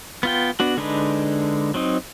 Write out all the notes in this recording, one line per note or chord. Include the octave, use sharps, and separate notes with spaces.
B3 F4 G5
B3 D4 F#4
D3 G#3 D4 D#4 B4
F#3 C4 D#4